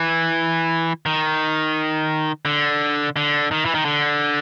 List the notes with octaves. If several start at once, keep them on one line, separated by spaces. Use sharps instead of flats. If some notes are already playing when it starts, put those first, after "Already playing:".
Already playing: E3
D#3
D3
D3
D#3
E3
D#3
D3